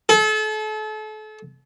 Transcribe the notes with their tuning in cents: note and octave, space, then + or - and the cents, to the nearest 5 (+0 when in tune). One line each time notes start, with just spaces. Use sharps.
A4 -35